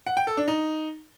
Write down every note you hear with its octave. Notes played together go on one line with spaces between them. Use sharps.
F#5
G5
A4
D4
D#4